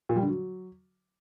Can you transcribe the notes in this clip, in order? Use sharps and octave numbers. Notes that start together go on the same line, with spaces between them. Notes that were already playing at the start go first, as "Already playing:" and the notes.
A#2
G3
D3
F#3